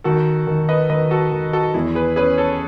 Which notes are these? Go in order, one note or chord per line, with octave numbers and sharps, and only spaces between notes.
D#3 F#4 A4
D#3
B4 D#5
D#3 B4 D#5
F#4 A4
D#3
F#4 A4
E2 E4 G#4
G#4 B4
C#4 G#4 B4
A4 C#5